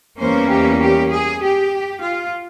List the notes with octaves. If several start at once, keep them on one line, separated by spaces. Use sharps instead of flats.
E2 E3 G3 A#3 C#4 C5
G4
G4
G#4
G4
F4